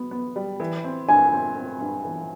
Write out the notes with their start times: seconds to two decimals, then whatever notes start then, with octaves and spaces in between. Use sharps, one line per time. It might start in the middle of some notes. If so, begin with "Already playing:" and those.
Already playing: B2 B3
0.11 B3
0.36 G3
0.60 E3
0.84 C4
1.09 G2 G#5
1.32 C4
1.56 C4
1.81 G2
2.05 E3